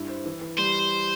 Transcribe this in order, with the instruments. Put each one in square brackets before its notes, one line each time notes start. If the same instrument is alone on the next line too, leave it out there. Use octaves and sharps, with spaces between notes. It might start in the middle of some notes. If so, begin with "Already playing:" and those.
Already playing: [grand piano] G2 E4
C5
E3
E3
[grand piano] G3 [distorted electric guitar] C5